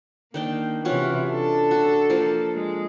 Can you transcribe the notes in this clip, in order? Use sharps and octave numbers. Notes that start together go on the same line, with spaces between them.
D#3 A#3 D4 G5
C3 E3 C#4 F4 F#4
D4 A4
F#4
F3 A#3
G#3